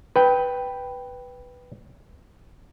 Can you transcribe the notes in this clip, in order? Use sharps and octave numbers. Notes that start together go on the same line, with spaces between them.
B4 G5